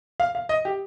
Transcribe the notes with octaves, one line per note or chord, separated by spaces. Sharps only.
F5
F5
D#5
G4